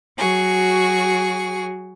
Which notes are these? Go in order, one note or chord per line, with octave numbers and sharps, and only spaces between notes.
F#3 F#4 G#4 C#6